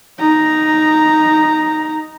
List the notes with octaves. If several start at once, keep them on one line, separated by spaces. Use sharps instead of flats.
D#4 A#5